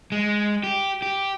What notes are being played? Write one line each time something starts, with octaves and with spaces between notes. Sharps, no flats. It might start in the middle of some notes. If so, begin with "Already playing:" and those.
G#3
G4
G4